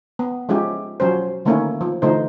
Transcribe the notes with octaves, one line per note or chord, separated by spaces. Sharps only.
B3
F3 G#3 C#4 E4 G4
F3 F#3 C#4 C5
D3 D#3 A3 A#3 C#4 E4
F3
D3 E3 F3 A3 D#4 C5